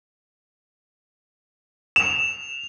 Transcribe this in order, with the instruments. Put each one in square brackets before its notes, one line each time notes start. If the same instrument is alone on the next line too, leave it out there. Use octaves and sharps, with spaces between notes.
[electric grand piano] E7 [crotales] F7